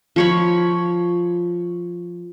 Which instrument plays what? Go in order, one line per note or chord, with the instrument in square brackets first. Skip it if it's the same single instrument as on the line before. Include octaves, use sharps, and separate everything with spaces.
[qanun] F3 C#5 B5